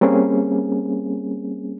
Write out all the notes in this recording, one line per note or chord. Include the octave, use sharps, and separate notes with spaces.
G3 A#3 C4 C#4 G#4